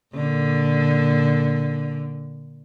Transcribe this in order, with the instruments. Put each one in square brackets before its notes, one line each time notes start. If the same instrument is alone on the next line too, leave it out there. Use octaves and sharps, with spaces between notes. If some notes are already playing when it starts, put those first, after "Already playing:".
[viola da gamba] A#2 D3